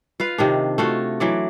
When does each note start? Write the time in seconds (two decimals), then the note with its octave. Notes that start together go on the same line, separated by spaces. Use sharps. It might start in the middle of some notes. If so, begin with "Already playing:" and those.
0.20 F4 B4 F5
0.38 C3 D#3 D4
0.78 A3 F4 F#4
1.20 E3 F#3 D5